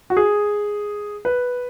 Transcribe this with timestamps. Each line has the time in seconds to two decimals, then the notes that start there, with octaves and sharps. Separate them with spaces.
0.10 F#4
0.17 G#4
1.25 B4